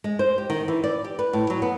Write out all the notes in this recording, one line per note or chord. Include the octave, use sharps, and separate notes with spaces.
G#3
C5
G4
D#3
E3
D5
G4
B4
A2
F#3
B3